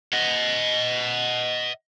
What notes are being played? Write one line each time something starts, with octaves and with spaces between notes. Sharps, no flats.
D#5 F#5